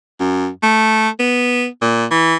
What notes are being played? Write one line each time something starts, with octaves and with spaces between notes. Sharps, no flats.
F#2
A3
B3
A#2
E3